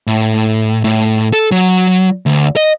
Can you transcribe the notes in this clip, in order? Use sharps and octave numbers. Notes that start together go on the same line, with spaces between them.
A2
A2
A4
F#3
D2
D#5